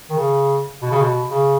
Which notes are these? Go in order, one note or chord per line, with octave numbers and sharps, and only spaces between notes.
D#3
C#3
B2
C#3
B2
C#3